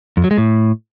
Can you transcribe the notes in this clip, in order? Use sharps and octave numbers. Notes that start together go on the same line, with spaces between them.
F2
F#3
G#3
A2